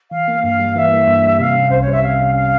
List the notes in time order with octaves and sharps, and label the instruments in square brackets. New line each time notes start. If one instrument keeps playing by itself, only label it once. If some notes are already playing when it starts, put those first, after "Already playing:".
[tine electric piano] E3 [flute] F5
[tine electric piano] A#3
[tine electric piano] G2 [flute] F5
[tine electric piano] G3
[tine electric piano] E3 [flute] E5
[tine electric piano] A#3
G2
G3
[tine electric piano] C3 [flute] F5
[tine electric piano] C#4
[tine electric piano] C2 [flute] C5
[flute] C#5
[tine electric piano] G3 [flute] E5
[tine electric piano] C3 [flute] F5
[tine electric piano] C#4
[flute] F5